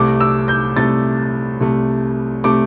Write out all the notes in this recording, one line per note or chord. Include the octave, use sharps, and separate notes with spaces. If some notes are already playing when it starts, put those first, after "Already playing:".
Already playing: C2 C3 A3 D6
E6
G6
C2 C3 A3 A6
C2 C3 A3
C3 A3 D6